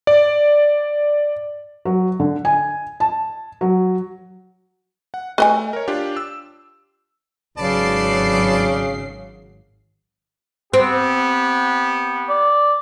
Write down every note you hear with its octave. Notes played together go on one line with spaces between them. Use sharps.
D5
F#3
D3
G#5
A5
F#3
F#5
A3 B4 D#5 G#5
A#4 C#5
D4 F4 G4
E6
G#1 C#3 F#3 B4 D5 A5 C7
B3 C4 G4
D5